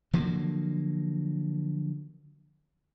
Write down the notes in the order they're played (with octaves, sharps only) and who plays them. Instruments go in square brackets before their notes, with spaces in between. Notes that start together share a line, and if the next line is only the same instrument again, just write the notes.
[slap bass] D3 F3 F#3 A#3